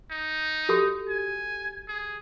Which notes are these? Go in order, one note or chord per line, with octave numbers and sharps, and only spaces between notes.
D#4
F#4 G4 A4
G#5
G#4